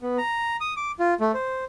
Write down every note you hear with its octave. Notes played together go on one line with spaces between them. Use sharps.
B3
A#5
D#6
D6
F4
A3
C5